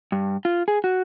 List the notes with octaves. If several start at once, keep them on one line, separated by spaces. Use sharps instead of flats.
G2
F4
G#4
F#4